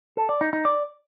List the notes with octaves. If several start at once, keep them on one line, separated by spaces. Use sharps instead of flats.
A4
D5
D#4
D#4
D5